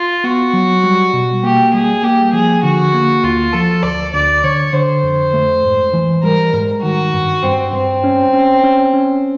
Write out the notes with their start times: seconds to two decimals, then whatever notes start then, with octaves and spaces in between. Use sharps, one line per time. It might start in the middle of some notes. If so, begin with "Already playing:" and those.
Already playing: F4
0.24 B3 F#4
0.53 F#3
0.84 G3
1.14 B2
1.44 A#3 G4
1.74 G3 G#4
2.03 A#3 G4
2.33 F3 G#4
2.63 D3 F#4
2.94 A#3
3.24 D2 F4
3.53 F3 A4
3.83 D2 D5
4.13 D2 D5
4.43 D3 C#5
4.73 D3 C5
5.03 F2
5.34 A3
5.63 G#2
5.93 E3
6.23 G3 A#4
6.53 G#2
6.83 D#3 F#4
7.14 G2
7.43 G2 C4
7.73 G2 C4
8.04 C#4
8.33 C#4
8.64 C#4
8.94 C#4